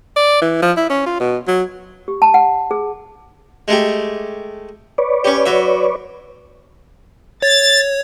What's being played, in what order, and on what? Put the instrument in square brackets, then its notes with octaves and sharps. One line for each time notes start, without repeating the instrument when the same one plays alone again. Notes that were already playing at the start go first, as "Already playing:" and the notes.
[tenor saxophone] D5
E3
F3
E4
C#4
F4
B2
F#3
[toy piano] G4
A5
F#5
G#4
[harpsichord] G#3 A3 G4
[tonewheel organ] B4 C#5 D5
[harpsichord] C#4 G4
F#3 E5
[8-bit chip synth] C#5 [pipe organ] A6